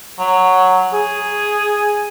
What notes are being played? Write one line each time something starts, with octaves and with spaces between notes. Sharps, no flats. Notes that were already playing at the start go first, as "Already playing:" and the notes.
F#3
G#4